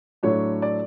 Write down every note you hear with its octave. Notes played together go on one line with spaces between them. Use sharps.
A2 F#3 A3 D4 C#5
D5